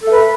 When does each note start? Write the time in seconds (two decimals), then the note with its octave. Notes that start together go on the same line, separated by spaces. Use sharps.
0.03 A4
0.07 A3
0.11 B4